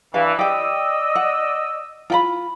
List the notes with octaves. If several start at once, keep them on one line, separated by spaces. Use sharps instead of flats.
G2 E3 F5
G4 D5 D#5 G5 E6
F#5
F4 G5 B5